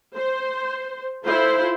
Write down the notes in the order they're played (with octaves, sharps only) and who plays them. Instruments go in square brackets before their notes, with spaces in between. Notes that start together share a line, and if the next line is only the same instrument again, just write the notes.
[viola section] C5
E4 F4 A4 C5